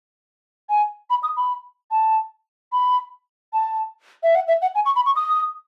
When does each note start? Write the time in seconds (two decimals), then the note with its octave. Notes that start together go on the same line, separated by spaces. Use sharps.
0.69 G#5
1.10 B5
1.23 D#6
1.37 B5
1.91 A5
2.72 B5
3.53 A5
4.23 E5
4.35 F#5
4.48 E5
4.62 F#5
4.75 G#5
4.86 C#6
4.96 B5
5.06 C#6
5.16 D#6